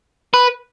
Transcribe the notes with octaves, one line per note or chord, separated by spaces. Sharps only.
B4